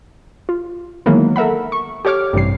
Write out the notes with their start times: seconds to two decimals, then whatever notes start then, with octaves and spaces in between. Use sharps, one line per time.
0.49 F4
1.06 D#3 E3 F#3 G#3 A#3 B3
1.36 A4 A#4 E5 F#5 B5
1.72 C#6
2.05 G4 A4 C#5 D6 F6
2.33 A1 G2 C3 G3 C7